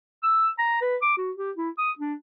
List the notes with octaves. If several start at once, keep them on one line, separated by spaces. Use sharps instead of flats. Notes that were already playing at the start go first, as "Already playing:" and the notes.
E6
A#5
B4
D6
F#4
G4
E4
D#6
D4